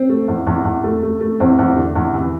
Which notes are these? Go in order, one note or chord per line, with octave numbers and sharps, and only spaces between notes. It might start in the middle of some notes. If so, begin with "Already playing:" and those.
Already playing: C4
A3
E2
E2
E2
A3
A3
A3
E2 C4
E2
D3
E2
E3